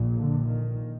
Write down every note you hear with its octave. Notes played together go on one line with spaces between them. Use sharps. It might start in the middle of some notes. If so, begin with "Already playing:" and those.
Already playing: A#1 A#2
D3
D#3